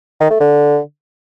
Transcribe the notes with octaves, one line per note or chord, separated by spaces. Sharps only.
D#3
A3
D3